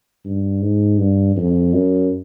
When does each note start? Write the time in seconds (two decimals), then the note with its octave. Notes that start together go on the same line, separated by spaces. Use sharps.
0.25 G2
0.62 G#2
0.98 G2
1.37 F2
1.73 F#2